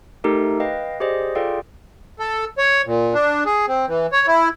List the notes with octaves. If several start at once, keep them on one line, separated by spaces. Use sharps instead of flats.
A3 D#4 G4 A4 A#4
B4 D#5 F5 G5
G4 G#4 C5 D5 D#5
F4 G#4 A4 D5 F5 G5
A4
C#5
A#2
D4
G#4
C4
E3
C#5
E4